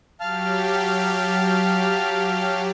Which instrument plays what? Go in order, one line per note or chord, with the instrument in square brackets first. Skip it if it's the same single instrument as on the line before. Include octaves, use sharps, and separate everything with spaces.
[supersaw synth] F#3 G4 [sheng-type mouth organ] F5 A5 F6